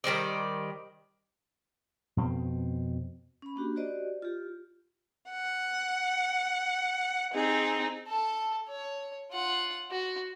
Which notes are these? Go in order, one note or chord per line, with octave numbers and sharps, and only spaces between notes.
D#3 G3 C5 D5
F2 B2 C4
C#4 B5
A#3 D4 F#4 G4
F#4 G4 C5 D5 D#5
F4 G4
F#5
C4 D#4 G#4
A4 A5
C#5
F4 F#5
F#4